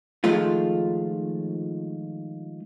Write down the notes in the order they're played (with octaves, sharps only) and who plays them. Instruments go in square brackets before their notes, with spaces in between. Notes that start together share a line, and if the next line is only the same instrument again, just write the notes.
[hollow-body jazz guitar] D#3 F3 G#3 A3 F4